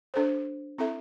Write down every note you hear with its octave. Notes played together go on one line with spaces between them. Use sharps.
D4 A4 C5
C4 E4 A4 E5